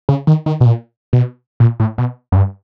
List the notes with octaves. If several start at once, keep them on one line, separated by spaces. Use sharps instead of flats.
C#3
D#3
D#3
B2
A#2
B2
A#2
A2
B2
F#2
G2